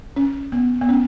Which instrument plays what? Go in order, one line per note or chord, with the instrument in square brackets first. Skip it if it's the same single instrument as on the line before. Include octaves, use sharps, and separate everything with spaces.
[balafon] C#4
B3
B3
C#4